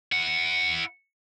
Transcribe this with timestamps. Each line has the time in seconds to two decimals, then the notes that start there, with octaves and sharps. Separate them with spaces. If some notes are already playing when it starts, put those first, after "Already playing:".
0.12 E4 F#5